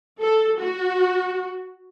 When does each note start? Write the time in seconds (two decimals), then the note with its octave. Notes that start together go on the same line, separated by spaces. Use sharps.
0.20 A4
0.59 F#4